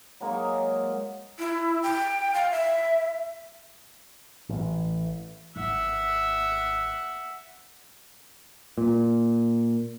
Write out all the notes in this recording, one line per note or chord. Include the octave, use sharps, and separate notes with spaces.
F#3 G#3 A#3 D#4
E4
G5
F5
E5
A1
G#1 E5 F#5
A#2